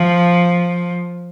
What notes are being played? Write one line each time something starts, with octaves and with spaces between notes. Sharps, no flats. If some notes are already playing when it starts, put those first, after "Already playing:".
Already playing: F3